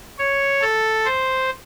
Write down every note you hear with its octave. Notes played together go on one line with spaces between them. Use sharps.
C#5
A4
C5